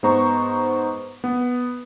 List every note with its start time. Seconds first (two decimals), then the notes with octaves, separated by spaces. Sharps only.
0.03 G#2 B3 C5 A#5 C#6
1.24 B3